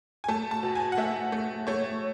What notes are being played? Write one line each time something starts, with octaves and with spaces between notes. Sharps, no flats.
G#5
A3 A5
A5
B2
G#5
F#5
A3 E5
A3
A3 C#5